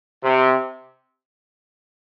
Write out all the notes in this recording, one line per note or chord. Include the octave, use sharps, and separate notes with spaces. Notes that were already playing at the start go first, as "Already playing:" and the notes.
C3